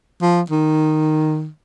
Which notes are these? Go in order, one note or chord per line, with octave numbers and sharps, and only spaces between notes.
F3
D#3